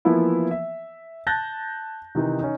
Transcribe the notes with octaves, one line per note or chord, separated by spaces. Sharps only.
E3 F3 A#3 B3 E4
E5
A5 F#6 G6 A6 A#6
C3 D#3 E3 D#4
C#4 D#4